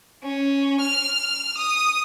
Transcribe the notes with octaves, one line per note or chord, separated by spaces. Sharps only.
C#4
F6
D#6